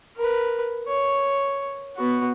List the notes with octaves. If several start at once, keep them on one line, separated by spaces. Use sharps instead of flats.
A#4 B4
C#5
B3 F#4